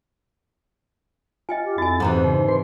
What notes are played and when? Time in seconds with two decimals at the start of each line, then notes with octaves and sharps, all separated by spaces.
1.49 F4 D#5 G5 G#5
1.65 G4
1.78 F2 E4 F#4 G#5 A6
2.00 G#2 C3 E3 C4 A4 F#5 A#5
2.24 C#3 D#4 C5
2.48 B4 C5 C6